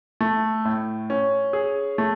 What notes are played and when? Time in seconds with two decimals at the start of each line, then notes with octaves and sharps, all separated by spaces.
0.21 A3
0.65 A2
1.10 C#4
1.53 G#4
1.98 A3